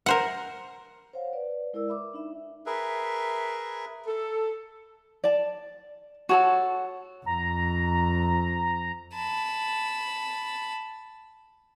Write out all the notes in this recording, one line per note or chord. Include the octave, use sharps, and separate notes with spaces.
A#4 C5 F#5
C5 C#5 F5 F#5
B4 D5
G#3 E4 A#4 D5 E6
E5 B5 D6
D4 D#4 E5
G#4 A#4 B4 E5
A4
D5 A5
F#4 G#4 A4 C#5 A5
F2 A#5
A5 B5